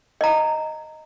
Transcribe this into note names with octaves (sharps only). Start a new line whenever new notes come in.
D#5 A#5